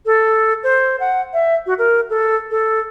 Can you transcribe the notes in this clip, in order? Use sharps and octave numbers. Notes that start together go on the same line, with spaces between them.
A4
C5
F#5
E5
F#4
A#4
A4
A4